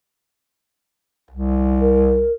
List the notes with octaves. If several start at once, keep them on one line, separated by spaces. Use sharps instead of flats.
C2
A#4